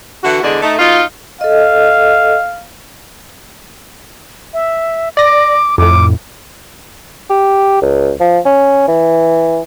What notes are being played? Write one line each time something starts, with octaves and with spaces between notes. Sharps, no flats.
D3 E3 E4 F#4
E2 D3 G#3 G#4 D5
A3 D#4
B2 D#4 F4
A4 D#5 F5
E5
D5 D6 A#6
F2 A2 D6
G4
C#2
F3
C#4
E3